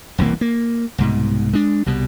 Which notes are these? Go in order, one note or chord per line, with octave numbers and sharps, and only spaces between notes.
E1 C2 E3 A#3
A#3
C2 G#2 B2
G#3 D4
C2 B2 G3